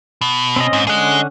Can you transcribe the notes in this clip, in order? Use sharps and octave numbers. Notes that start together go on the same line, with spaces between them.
B2
C4 C#4 D#5
G#2
D3 C#4 G#4 D#5 F#5